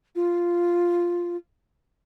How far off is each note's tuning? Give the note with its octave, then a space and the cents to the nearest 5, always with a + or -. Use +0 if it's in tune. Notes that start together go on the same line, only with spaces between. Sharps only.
F4 -5